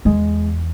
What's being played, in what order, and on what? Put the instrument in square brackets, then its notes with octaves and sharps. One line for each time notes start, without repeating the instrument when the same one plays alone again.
[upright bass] E2 [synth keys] G#3